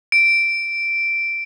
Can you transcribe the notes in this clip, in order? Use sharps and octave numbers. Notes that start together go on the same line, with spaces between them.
D7